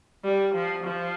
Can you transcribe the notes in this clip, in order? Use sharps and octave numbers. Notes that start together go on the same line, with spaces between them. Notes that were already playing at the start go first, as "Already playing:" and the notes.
G3
F3
F3